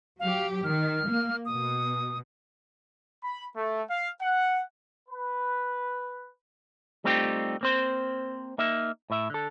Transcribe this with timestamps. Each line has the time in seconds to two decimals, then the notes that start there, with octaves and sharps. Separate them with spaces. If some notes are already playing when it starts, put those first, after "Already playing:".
0.19 F#3 G4 F5
0.64 D#3 F6
1.07 A#3
1.45 B2 D#6
3.24 B5
3.57 A3
3.90 F5
4.22 F#5
5.09 B4
7.04 G3 A3 C4 D#4 F4 G4
7.61 A#3 C4 C5
8.58 A#3 D#4 E5
9.10 A2 E5
9.30 D3 A4